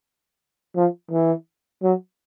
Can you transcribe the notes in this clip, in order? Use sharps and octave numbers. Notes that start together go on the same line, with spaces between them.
F3
E3
F#3